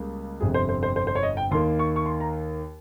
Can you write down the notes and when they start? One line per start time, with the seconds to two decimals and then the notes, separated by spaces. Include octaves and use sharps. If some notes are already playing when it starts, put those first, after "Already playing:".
Already playing: C#2 C#3 G3 A#3
0.40 G1 F2 C3 G#4
0.54 C5
0.69 C5
0.83 C5
0.96 C5
1.07 C5
1.15 C#5
1.23 D#5
1.37 G5
1.51 D#2 D#3 A#3 C6
1.79 C#6
1.96 C#6
2.06 C6
2.20 A#5